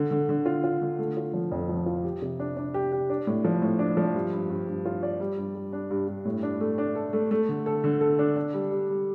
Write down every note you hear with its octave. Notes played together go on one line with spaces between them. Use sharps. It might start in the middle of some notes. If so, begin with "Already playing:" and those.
Already playing: D3
D3
D3
F4
F4
D3
A3
F4
F3
F2
F3
F4
G4
C3
D4
D4
G4
G4
D4
A2
F3
A2
D4
F3
G2
G2
G2
G2
F4
D5
G3
G2
G3
D4
G2
G2
A2
D4
A3
D4
A4
A3
A3
D3
A4
D3
A4
D4
D4
G3
G3
G3